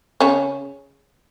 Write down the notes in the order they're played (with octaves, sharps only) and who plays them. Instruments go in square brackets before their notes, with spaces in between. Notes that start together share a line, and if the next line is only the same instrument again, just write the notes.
[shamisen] C#3 C#4